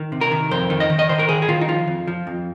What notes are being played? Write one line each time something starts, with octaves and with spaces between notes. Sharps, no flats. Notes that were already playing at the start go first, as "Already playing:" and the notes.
Already playing: D#3
C3
A#4
D#3
F2 C5
D#3
D#5
D#3
D#5
D#3 C5
A#4
D#3 G#4
G#4
D#3 F4
D#4
F3 F4
F2
F3
F2